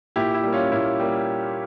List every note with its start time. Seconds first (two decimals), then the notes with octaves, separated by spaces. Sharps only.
0.16 A#2 E4 G4
0.34 E4
0.43 G3 A#3
0.53 C#4 F4
0.72 A#2 E4
0.99 G3 A#3